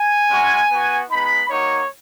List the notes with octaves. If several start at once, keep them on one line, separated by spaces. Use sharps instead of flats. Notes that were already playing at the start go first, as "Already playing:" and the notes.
Already playing: G#5
G#3 C#4 F#4
B3 F#4
G#3 B3 D#4 B5
A#3 D#4 F#4 C#5